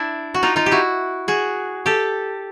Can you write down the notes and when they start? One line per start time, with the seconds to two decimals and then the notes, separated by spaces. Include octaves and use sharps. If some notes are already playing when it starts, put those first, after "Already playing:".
Already playing: D4 E4
0.34 F#4
0.43 D#4 F4
0.56 D#4 F4
0.66 G4
0.71 E4 F#4
1.28 F#4 G#4
1.86 G4 A4